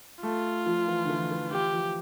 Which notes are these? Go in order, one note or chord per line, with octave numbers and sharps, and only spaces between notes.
A3 F4
F3
E3
D3
E3
E3
E3 G4
F3